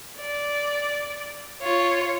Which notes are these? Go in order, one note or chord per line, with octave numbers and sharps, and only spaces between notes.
D5
F4 C#5